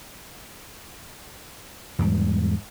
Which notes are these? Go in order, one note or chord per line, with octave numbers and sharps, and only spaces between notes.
E2 G#2 G3